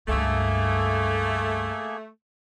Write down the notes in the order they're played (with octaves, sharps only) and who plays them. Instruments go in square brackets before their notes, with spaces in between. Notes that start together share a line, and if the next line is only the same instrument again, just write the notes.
[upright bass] C#2 G2 [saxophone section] A3 [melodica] A#3 G#4